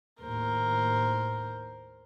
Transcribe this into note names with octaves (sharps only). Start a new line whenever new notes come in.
D#2 A2 A#4 C5